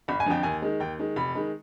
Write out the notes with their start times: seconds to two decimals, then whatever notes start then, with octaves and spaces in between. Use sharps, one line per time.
0.08 G1 B5
0.20 G#5
0.26 F2 D3 F3 G5
0.43 D#2 G#5
0.62 D#3 G#3
0.80 D#2 G5
0.99 D#3 G#3
1.16 F1 B5
1.35 D#3 G#3